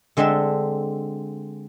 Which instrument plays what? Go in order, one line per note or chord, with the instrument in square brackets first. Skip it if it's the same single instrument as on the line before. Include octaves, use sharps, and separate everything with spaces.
[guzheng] D3 G#3 C4 A4 E5